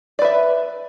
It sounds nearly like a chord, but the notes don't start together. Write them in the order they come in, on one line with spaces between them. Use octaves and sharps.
D5 B4 E5